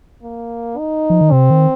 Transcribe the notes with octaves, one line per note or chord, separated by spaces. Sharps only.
A#3
D#4
F3
D#3
C3 C4
D#3